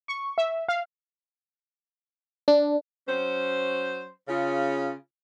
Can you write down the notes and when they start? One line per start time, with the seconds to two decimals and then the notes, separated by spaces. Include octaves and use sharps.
0.08 C#6
0.38 E5
0.68 F5
2.48 D4
3.08 F#3 C#4 C5
4.28 C#3 F4